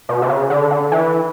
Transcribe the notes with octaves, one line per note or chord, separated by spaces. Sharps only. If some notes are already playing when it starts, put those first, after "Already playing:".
B2
C3
C#3
D3
D3
E3